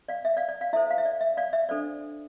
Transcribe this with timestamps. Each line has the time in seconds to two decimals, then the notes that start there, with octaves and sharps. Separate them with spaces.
0.08 D5 F5
0.25 E5
0.37 D5 F5
0.49 D5
0.61 D5 F5
0.73 E4 A4 C5 E5
0.90 F5
0.98 E5
1.05 D5
1.21 E5
1.37 D5 F5
1.53 E5
1.69 D4 A4 C5 D5